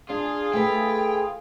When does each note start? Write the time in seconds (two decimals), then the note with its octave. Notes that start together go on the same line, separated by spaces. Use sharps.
0.10 D4 F4 G#4
0.53 A3 B4 G5